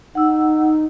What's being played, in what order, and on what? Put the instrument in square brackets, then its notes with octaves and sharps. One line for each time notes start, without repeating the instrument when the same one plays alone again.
[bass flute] D#4 [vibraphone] F#5 E6